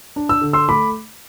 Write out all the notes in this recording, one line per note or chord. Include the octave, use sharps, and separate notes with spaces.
D4
E6
D3
C6 E6
A3 B5 D6